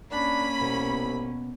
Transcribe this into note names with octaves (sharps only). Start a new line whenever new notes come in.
A#3 C#4 D4 B5
C2 B2